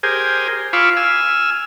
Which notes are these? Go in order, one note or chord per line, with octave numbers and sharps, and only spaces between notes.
G4 G#4 A#4 C5 G#5
F4 F5 B5 C#6 D6 E6
G#5 E6 F6